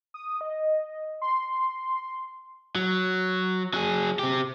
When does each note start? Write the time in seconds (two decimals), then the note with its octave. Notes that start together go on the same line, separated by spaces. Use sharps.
0.14 D#6
0.41 D#5
1.22 C6
2.75 F#3
3.74 F#3 G#4
4.19 C4 G4